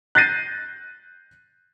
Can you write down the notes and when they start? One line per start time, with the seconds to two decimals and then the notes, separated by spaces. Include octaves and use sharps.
0.15 F#6 G6 A6 A#6 C7 D#7